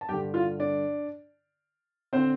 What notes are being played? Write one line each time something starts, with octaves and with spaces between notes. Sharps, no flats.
A5
G2 D3 G4 G5
F4 F5
D4 D5
D3 C4 C5